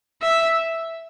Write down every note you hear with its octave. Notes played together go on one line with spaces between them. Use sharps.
E5